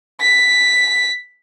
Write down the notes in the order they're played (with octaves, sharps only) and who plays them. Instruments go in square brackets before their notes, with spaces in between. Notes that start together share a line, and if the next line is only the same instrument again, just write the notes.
[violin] B6